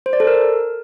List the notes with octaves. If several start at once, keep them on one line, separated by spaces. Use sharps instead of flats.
C5
D5
A4
A#4